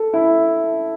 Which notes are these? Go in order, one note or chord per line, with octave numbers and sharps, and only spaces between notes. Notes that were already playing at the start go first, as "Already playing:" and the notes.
Already playing: A4
E4